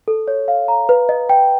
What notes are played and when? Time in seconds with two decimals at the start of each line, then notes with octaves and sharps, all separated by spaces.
0.08 A4
0.28 C#5
0.48 F5
0.68 A#5
0.89 B4
1.09 D#5
1.29 G5